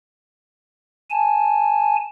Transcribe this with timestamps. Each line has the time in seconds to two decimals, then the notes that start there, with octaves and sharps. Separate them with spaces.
1.10 G#5 A5